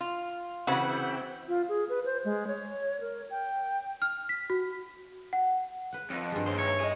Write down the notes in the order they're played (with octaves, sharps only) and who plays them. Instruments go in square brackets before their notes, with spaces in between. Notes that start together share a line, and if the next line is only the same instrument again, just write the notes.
[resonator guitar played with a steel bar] F4
[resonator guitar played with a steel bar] C#3 E3 [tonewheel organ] C4 E5 G5 [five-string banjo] F#4 B5 [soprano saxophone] F#5
[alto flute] F4
G#4
B4
C5
G#3
C#5
A#4
G5
[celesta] F6
B6
F#4
F#5
[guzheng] B4 F#5
[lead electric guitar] F2 [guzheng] B4 D#5 F5
[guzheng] G2 G#3
[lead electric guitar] D#2 [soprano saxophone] C5
[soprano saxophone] C#5 [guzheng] E5
[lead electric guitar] G#4 D#5